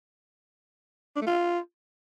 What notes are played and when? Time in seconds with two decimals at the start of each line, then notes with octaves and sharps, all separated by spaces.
1.16 D4
1.21 A3
1.27 F4